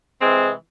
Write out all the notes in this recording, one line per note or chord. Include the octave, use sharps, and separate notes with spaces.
C3 E3 G#3 C4